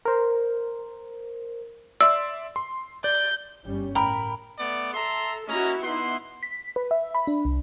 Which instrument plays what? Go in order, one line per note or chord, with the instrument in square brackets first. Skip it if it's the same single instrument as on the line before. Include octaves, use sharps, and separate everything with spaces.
[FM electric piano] A#4 C5
[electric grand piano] D5 E5 C6 [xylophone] E6
[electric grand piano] C6
[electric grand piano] D5 [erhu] G6
[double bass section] G1 G3 C#4
[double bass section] A2 [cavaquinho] A#4 [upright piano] G5 B5
[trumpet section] A3 B3 D5
[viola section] A4 [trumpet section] E5 A#5 C6
[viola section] A#3 E4 F#4 [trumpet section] C#4 D#5 A#5
[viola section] B3 D#4 E4 [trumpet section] F#5 C6
[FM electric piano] B6
B4
E5
B5
D4
C2